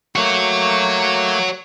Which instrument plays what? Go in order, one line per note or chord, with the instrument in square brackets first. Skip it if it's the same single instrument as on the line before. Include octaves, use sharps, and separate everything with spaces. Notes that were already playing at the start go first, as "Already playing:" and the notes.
[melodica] A3 A#3 [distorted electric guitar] F#4 C#5